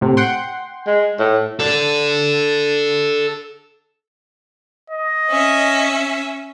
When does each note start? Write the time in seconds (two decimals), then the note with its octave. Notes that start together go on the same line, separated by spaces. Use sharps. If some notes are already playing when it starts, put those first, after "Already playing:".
0.01 A2 C3
0.17 F#5 G5 C6
0.87 G#3
1.19 A2
1.60 A4 D5
4.90 D#5
5.30 C#4 E5